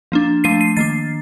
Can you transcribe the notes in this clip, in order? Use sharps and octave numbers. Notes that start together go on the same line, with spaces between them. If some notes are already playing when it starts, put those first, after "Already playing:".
F3 A#3 D4
F3 A3 D4 C7 D#7
C7 D#7
D#3 A#3 D4 A6 C7